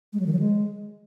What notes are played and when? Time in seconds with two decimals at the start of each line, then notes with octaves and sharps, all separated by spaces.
0.13 G#3
0.20 F#3
0.26 D#3
0.33 F#3
0.39 G#3